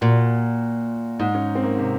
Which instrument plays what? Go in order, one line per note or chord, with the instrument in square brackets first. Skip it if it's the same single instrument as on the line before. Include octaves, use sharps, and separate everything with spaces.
[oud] A#2 [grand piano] F#4
[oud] G#2 [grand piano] D#4
[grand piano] C#4
C4
A#3
C3